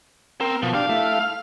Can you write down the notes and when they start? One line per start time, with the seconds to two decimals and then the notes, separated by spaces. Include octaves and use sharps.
0.41 C4 A#4
0.63 B2 F3
0.74 D4 G4 F5
0.89 A3 E4
1.21 F6